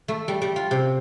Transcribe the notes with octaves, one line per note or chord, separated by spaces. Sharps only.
A3
G3
G3
F4
C3